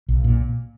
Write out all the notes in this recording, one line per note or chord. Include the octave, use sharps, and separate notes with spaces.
B1
A#2